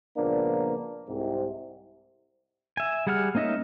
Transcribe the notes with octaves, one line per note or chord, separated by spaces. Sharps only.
C#2 A#2 F3 A#3 B3 D4
C2 G#2 C3
E5 G#5
G3 G#4 F#5 G#5 F6
A#3 C#4 D#4 D#5 E5